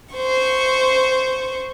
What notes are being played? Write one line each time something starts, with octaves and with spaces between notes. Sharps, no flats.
C5 C#6